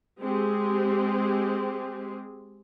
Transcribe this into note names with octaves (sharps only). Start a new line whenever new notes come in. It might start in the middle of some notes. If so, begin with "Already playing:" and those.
G#3 C4 G4 G#4